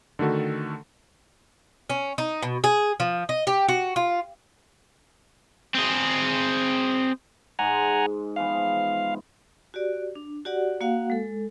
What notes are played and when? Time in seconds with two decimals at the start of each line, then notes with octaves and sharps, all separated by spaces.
0.19 D3 D#3 A3 F#4 A4
1.90 C#4
2.18 D#4
2.42 B2
2.64 G#4
3.00 F3
3.29 D#5
3.47 G4
3.68 F#4
3.96 F4
5.75 C4 G#4
7.59 G#2 G#3 F#5 G#5 A#5
8.36 E3 F3 B3 F5
9.74 F#4 G4 D5
10.15 D4
10.45 F#4 G4 D5 F#5
10.81 A#3 F#4 F5 F#5
11.10 G#3 A4